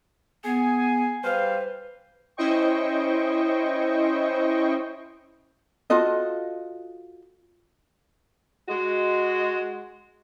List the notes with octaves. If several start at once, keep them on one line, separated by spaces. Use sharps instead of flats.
B3 G#4 G#5
G3 B4 C5 F5
C#4 E4 C5 D#5 G5 C#6
F4 F#4 A4 D#5
G#3 F#4